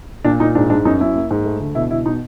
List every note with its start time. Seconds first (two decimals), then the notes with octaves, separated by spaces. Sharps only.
0.24 A#2 D4
0.40 A#2 D#4
0.55 G#2 D4
0.70 G#2 D4
0.85 F#2 D#4
1.01 F#2 E4
1.15 A#3
1.31 G#2
1.45 A3
1.60 D2
1.75 B2 E4
1.90 B2 E4
2.06 B2 D#4